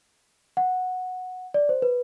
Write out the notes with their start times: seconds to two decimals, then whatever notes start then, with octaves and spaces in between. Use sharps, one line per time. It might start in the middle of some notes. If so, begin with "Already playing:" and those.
0.57 F#5
1.54 D5
1.69 C5
1.82 B4